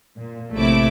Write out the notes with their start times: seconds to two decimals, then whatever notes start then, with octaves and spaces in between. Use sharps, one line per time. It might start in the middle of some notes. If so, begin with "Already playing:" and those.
0.18 A#2
0.53 A#1 A2 C3 A3 E4 D6